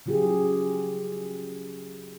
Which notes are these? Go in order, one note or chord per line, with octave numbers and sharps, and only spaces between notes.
C#3 F#3 F4 G4 G#4